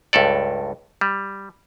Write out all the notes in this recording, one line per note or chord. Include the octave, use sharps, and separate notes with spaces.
C#2 G2 A4 D5
G3